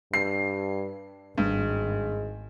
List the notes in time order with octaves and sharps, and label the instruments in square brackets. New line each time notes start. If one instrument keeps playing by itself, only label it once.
[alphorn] G2 [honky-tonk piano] C7
[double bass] G#1 [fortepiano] G2 [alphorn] G#3